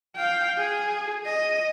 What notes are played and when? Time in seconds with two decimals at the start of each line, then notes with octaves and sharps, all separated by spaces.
0.16 F5 G5
0.58 G#4
1.26 D#5